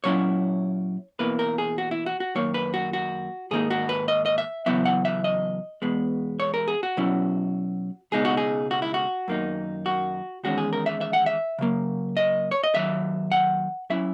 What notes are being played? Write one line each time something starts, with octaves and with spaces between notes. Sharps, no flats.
A#2 F#3 C#4 E4 C#5
E2 B2 A#3 E4 B4
A#4
G#4
F#4
E4
F#4
F#4
F#2 D#3 A#3 C#5
B4
F#4
F#4
G#2 D#3 A#3 D#4 G#4
F#4
B4
D#5
D#5
E5
E2 C#3 F#3 B3 E4 E5
F#5
E5
D#5
E2 B2 G#3 B3
C#5
A#4
G#4
F#4
B2 F#3 C#4 E4
C#2 B2 G#3 D#4 G#4
F#4
G#4
F#4
E4
F#4
F#2 D#3 A#3 D#4
F#4
E2 D#3 G#3 C#4 F#4
G#4
A#4
E5
E5
F#5
E5
C#3 F#3 A#3
D#5
C#5
D#5
D#2 D#3 F#3 E5
F#5
F#3 C#4 E4 E5